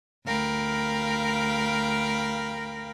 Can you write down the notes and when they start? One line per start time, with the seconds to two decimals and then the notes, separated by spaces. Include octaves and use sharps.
0.25 D2 A#4 F5 G5 B5